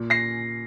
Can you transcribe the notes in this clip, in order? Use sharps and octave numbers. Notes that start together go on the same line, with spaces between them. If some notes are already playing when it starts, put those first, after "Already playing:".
Already playing: A#2
A#6 C7